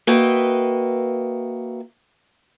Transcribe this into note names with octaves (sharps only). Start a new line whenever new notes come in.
A#3 F#4 B4 D#5 E5 G5